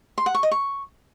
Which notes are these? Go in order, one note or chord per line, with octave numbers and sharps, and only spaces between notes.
C6
F#5
C#6
D#5
C#6